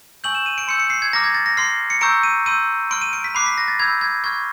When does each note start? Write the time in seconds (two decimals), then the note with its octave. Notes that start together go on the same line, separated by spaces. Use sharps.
0.24 G#5 C#6 E6 G6 F#7
0.35 E7
0.46 D#7
0.58 D7
0.68 C6 E6 G6 C#7
0.80 C#7
0.90 C7
1.02 G#6
1.13 A#5 D6 F6 A#6
1.24 G#6
1.35 A6
1.46 A#6
1.57 C6 F6 C7
1.90 C#7
2.01 A#5 C#6 E6 G6 D7
2.23 D#7
2.46 C6 E6 G6 D#7
2.91 C6 F6 D7
3.02 D#7
3.13 D7
3.24 B6
3.35 B5 D6 F#6 C7
3.46 B6
3.58 A#6
3.68 A6
3.80 B5 E6 G6 G#6
4.01 G#6
4.24 C#6 F6 G#6